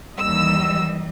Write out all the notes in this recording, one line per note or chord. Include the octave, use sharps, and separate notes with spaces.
D#2 E3 G3 D#5 E6